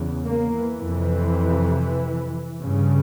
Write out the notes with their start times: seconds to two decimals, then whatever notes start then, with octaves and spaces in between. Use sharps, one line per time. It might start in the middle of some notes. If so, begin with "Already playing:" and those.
Already playing: E2 C#3
0.22 A#3
0.52 E3
0.82 F2 C3
2.63 G2 C#3